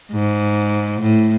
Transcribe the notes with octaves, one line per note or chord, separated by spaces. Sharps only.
G#2
A2